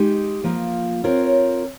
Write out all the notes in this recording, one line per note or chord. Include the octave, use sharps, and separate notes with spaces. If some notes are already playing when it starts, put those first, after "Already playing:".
Already playing: G#3 D#4 G4
F3 A#3 F4
C4 F4 A#4 C#5